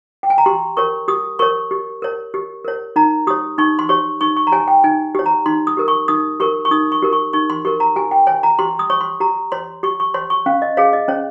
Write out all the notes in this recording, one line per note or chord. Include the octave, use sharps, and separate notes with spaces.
G5
G#5
A#5
G4 C6
A#4 C#5 C#6
G4 D#6
A#4 C#5 C#6
G4
A#4 C#5
G4
A#4 C#5
D#4 A#5
G4 C#5 D#6
D#4 C#6
C6
G4 C#5 C#6
D#4 C#6
C#6
A#5
G4 C#5 G#5
G5
D#4 G#5
G4 C#5
A#5
D#4 C6
D#6
G4 A#4
C#6
D#4 D#6
G4 A#4 C#6
C#6
D#4 D#6
C#6
G4 A#4
C#6
D#4 C#6
C6
G4 A#4 C#6
A#5
G4 G#5
G5
C#5 G#5
A#5
G4 C6
D#6
C#5 C#6
C6
G4 A#5
C#5 C6
G4 C#6
C#6
C#5 C6
C#6
C#4 F5
D#5
G#4 C#5 F5
D#5
C#4 C#5